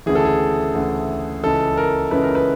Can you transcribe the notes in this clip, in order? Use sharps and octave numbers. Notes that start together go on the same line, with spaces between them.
D2 C#3 E3 G#4
A4
G#4
D2 C#3 E3
C#2 C#3 E3 A4
A#4
C#2 C#3 E3 B4
A#4
B4